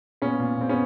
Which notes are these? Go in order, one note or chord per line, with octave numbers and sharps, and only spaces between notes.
A#2 B3 C#4
A#2
A#2 C4
B3 C#4